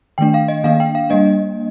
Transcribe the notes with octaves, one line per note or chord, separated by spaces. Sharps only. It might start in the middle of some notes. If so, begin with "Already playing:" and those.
D#3 A3 D4 G5
F5
D#5
D#3 A#3 D4 F5
G5
F5
G3 A#3 D4 D#5